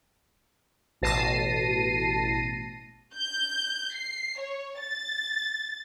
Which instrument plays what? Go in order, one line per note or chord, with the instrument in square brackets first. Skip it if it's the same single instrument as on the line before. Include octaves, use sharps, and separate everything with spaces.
[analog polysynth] A1 B2 A5 A#6 C7 D#7
[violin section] G6
C7
C#5
A6